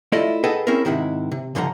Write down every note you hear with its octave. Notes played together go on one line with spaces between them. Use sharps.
A3 E4 F4 A4 D5 D#5
G#4 A4 B4 D#5 F#5 G5
C4 C#4 E4 G#4 A#4
G#2 C3 D#3 E4 F#5
C3
C#2 G2 D3 F3 F#5 A#5